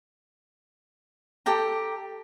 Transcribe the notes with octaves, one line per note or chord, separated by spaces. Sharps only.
G4 A4 G5 A#5